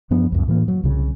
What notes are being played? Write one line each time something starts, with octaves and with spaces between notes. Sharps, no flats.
F#2 F3 B3 D4
C#2 F#2
A2 E3 G3 A#3
F#3
C2 C#3